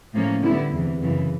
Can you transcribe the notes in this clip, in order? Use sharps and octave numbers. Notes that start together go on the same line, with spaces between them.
A2 F3 A#3 C#4
D3 G3 B3 E4
E2 C3 E3
F#2 C#3 E3